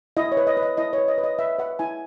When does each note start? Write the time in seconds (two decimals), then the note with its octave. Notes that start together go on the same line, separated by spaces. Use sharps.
0.17 E4 D#5
0.32 C#5
0.37 B4
0.47 D#5
0.57 B4
0.63 D#5
0.77 E4 D#5
0.93 B4 C#5
1.08 D#5
1.18 B4
1.24 D#5
1.39 B4 E5
1.59 B4 F#5
1.79 E4 G#5